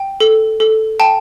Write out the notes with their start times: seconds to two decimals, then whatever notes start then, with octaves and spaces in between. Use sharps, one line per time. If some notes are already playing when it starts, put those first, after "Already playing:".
Already playing: G5
0.20 A4
0.60 A4
1.00 G5 A5